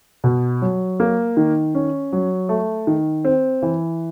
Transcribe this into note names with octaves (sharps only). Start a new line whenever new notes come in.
B2
F#3
A#3
D#3
C#4
F#3
A3
D#3
C4
E3